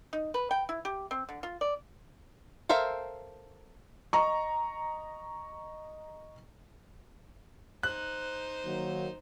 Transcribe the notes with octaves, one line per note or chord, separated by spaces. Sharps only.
D#4
B4
G5
E4
G4
C4
D3
F4
D5
A4 A#4 C5 E5 F5
D#5 A#5 C#6
D#4 C5 F#6
D#3 F#3 A#3